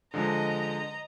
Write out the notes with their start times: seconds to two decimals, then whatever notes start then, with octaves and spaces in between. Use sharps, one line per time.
0.14 D3 F3 G#3 D#5 A#5